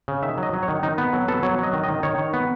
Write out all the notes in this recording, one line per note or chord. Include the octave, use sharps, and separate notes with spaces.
C#3
D#3 E5
F#3
D#5
F#3
C#5
D#3
D#3 D#4
B3 B4
F#3 A4
B3 A4
F#3 C#5
F#3 D#5
D#3
D#5
D#3
D#3 C#5
D#3
B3